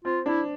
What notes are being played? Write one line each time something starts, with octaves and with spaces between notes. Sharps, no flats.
C4 F4
D4 E4